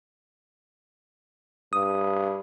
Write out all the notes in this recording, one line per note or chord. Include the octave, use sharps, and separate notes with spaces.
G2 D#6